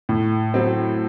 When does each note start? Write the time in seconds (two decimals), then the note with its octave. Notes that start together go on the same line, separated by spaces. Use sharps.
0.09 A2
0.54 F#3 C4